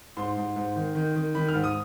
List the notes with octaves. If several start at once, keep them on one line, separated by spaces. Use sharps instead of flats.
G#2 C6
G#2
G#2
D#3
D#3
D#3
D#3 B5
F6
G#2
D#6